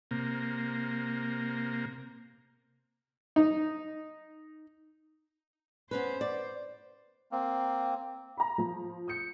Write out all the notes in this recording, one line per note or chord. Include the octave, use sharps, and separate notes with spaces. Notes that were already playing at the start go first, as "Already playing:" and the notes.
C3 A#3
D#4
B3 C#4 B4 C5
D5
A#3 C4
A#5 B5
F3
D#6 G6 C#7